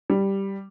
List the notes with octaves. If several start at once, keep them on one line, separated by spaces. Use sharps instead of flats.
G3